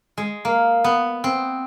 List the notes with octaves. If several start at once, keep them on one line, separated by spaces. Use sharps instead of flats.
G#3
A#3
B3
C4